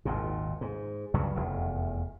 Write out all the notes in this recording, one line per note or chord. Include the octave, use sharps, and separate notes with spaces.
G#1 D#2 A#2
G#2
C#2 G2 C#3 F#3
F1 E2